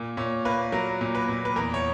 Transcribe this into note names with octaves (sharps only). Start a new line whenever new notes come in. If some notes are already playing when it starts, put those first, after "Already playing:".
Already playing: A#2
A#2 C#5
A#3 B4
F#3 A#4
A#2
B4
A#2
B4
E2 A#4
C#5